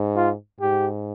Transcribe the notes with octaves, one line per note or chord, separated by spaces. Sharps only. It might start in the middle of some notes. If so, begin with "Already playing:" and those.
Already playing: G#2
F4
G#2 G4